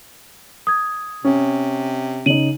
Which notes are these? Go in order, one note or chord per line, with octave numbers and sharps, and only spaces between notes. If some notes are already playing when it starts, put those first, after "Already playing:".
D#6 G#6
C3 C#4
C#3 D#4 D#7 F#7